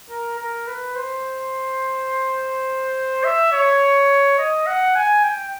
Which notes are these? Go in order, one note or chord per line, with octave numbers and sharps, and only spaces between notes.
A#4
A#4
B4
C5
E5
C#5
D#5
F#5
G#5
G5